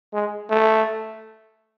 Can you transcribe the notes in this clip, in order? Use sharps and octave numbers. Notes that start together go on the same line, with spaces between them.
G#3
A3